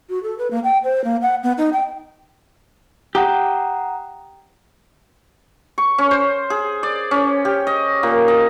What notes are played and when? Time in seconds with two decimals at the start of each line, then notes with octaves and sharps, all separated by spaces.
0.09 F#4
0.23 A4
0.38 B4
0.51 A#3
0.64 G5
0.84 C5
1.04 A#3
1.22 F#5
1.43 B3
1.58 D#4
1.73 G5
3.15 G4 F#5 A#5 D#6
5.78 C#6
5.98 C#4
6.11 C5
6.50 G#4
6.83 D5
7.11 C#4
7.45 G4
7.67 D#5
8.03 A#2
8.28 D#5